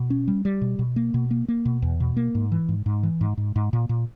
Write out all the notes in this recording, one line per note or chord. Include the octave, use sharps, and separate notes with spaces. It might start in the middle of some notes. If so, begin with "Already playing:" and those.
Already playing: B2
C#4
G3
G3
B2
B2
A#3
B2
A#3
A#3
B2
E2
B2
A#3
G#2
E3
G#2
G#2
E3
G#2
G#2
G#2
A#2
A#2